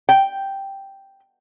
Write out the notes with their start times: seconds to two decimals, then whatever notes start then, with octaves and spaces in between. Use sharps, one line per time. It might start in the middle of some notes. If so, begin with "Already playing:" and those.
0.09 G5